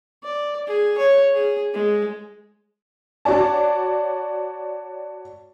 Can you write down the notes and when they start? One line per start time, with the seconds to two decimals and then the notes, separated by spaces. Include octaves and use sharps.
0.23 D5
0.67 G#4
0.98 C#5
1.34 G#4
1.74 G#3
3.25 F#4 C#5 D5 A5